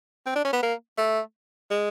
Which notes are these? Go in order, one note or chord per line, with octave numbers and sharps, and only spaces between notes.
C4
D4
C#4
B3
A#3
A3
G#3